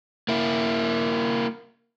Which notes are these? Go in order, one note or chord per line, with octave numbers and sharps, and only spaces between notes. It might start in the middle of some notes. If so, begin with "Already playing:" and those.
A#3 E4